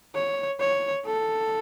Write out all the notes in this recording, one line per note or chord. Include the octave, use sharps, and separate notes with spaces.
C#5
C#5
A4